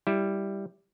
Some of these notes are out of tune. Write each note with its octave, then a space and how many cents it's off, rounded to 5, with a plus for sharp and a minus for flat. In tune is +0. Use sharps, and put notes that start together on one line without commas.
G3 +0 E4 +0